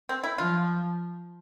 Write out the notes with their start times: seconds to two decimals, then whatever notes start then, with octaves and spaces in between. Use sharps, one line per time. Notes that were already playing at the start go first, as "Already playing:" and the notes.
0.09 C4
0.24 E4
0.38 F3 F4